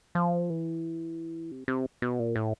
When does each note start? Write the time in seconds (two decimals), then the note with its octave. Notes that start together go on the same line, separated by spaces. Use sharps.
0.15 F3
0.50 E3
1.51 C3
1.68 C3
2.02 B2
2.20 A#2
2.36 A2